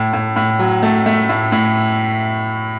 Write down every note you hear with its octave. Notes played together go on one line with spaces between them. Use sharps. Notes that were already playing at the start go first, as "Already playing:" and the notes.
Already playing: A2
A2
A2
F#3
A3
A3
A2
A2